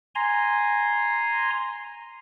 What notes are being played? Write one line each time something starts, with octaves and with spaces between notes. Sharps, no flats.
G#5 A#5 C6